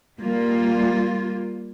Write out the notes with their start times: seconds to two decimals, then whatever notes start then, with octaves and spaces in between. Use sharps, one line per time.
0.19 G3 A#3 F4